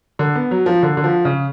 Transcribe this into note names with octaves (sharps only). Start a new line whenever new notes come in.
D3
B3
F#3
F3
D3
D3
F3
C#3